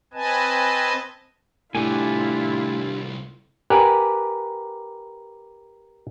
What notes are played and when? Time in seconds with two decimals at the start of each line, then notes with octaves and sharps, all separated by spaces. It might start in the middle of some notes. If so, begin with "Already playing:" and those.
0.14 C4 B4 D#5 G#5 A5
1.75 C2 A2 A3 D4 E4 F4 G4 G#5
3.70 G4 A#4 B4 D5 F#5 G#5